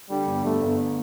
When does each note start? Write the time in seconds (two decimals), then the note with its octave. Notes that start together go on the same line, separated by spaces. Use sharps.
0.10 D3 G3
0.27 G1
0.44 G1 A3
0.61 G1